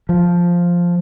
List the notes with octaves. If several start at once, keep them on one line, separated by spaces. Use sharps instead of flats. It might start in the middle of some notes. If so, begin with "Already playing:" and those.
F3